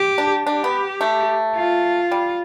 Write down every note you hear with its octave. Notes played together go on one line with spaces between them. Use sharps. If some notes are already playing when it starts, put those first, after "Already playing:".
Already playing: G4
D4
D4 G4
B3
A3
F4
G3